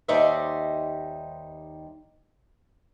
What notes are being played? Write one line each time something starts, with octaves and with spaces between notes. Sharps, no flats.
D#2 G3 D#4 C5 D5 E5